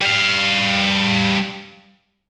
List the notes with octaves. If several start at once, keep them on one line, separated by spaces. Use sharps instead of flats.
G3 F5